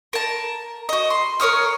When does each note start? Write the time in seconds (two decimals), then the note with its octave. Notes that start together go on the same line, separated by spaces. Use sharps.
0.13 A#4 A5
0.89 F#4 D#5
1.10 C6
1.40 A#4 C#5 D#6 F6